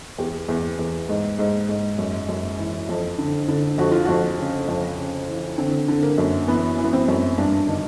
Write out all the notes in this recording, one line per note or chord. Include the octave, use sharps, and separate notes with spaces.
E2 G4
E2
E2
G#2
G#2
G#2
F#2
F#2
E3
F2
D3
D3
F2 F#4
F4
F2 F#4
C#3
F2
C#3
E3
D3 C4
D3
A#3
F#2
E3 B3
E3
B3
C4
F#2
G2 D4
D#3 D4